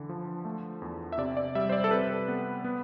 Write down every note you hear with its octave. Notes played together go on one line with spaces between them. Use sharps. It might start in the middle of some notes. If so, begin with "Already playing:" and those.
Already playing: D3 E3
F3
A3
E2
E5
C3 D5
D5
G3 E5
C5
D5
A4
C3 B4
B3
B3